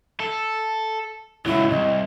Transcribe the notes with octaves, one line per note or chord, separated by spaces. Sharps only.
A4
C#2 F#3 E4
C2 D#5